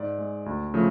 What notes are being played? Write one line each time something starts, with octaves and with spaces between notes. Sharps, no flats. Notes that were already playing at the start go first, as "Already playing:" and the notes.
Already playing: G#2 D5
G#3
D2
C#3 F3 A3